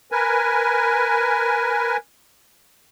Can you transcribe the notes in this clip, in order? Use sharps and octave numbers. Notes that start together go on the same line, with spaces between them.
A#4 B4 G#5